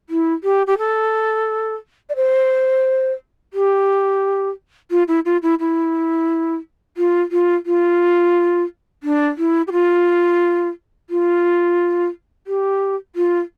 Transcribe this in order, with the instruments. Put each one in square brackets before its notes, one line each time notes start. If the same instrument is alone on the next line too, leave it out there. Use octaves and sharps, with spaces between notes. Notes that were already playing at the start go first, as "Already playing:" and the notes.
[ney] E4
G4
G4
A4
D5
C5
G4
F4
E4
F4
E4
E4
F4
F4
F4
D4
E4
G4
F4
F4
G4
F4